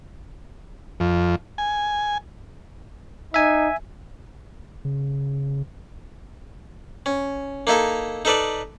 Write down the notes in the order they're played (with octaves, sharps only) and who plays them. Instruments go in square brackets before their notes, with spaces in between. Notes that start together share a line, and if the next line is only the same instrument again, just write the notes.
[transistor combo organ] F2
G#5
[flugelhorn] D#4 [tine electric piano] E5 G#5
[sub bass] C#3
[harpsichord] C#4
A#3 D#4 E4 A4
D#4 A4 B4 D5